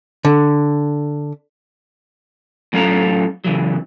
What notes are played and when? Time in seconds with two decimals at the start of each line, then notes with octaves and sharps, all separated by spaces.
0.25 D3
2.73 A2 F#3 C#4 F4 A4 A#5
3.45 C#3 E3 F#3